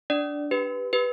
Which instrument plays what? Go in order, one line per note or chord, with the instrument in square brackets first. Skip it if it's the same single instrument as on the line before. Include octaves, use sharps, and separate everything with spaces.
[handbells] D4 D5
G4 B4
G4 B4